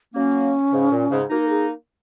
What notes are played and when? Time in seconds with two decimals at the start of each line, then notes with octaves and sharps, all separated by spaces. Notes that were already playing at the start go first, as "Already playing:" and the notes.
0.14 F#3 A#3 C#4
0.72 G#2 C#3
0.91 A#2
1.10 G#2 C#3
1.30 A#3 D#4 F#4
1.40 A#4
1.49 G#4